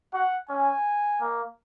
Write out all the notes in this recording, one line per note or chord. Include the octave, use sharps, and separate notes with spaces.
F#4 F#5
C#4 G#5
A#3